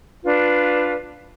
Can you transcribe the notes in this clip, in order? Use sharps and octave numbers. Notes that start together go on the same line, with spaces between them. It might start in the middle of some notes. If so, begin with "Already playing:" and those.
D4 F4 B4